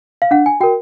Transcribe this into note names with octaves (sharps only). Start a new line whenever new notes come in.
F5
D4 F#5
G#5
F#4 A#4 G5